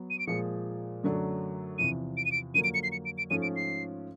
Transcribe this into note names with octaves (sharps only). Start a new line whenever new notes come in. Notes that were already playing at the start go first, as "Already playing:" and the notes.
Already playing: F#3 B3
D#7
D7
A#2 F3 G#3 C#7
F#2 D3 F#3 A3 D4
E2 C3 F3 D#7
D7
D#7
D7
F2 D3 F#3 A#3 D#7
D7
C#7
C7
C#7
D7
D7
G#2 F3 A3 C#4 D#7
D7
C7